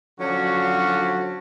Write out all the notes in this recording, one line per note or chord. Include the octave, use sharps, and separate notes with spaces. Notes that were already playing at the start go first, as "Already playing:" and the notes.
D3 F3 F#3 C#4 D4 F#4